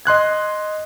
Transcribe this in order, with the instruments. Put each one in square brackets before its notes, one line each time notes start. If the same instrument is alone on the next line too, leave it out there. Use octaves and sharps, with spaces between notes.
[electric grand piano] D#5 C6 F#6 G#6